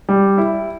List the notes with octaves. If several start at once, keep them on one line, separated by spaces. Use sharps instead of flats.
G3
E4